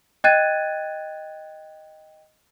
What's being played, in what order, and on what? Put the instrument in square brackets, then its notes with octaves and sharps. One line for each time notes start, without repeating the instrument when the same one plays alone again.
[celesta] D#5 G5 F#6 G#6 A6 D#7